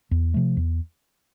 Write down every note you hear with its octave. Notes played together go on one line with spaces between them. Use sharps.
E2
C3 F3 A3
E2